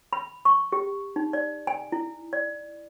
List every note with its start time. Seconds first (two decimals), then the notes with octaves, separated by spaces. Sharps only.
0.13 B5
0.45 C#6
0.72 G4
1.16 D#4
1.33 D5
1.67 G#5
1.92 E4
2.33 D5